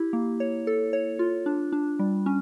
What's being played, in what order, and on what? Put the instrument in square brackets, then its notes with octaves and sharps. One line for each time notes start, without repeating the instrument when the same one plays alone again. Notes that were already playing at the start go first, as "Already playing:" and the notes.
Already playing: [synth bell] E4 G4
A#3
C#5
A4
C#5
F4
D4
D4
G3
C#4